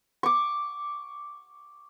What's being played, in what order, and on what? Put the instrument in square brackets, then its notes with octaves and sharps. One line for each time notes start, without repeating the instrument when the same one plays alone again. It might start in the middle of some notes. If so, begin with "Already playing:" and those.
[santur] C#6 D6